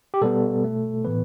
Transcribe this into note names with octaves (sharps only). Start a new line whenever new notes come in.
G4
B2 G3 B3 A4
B2 A3
A2 E3 B3 B4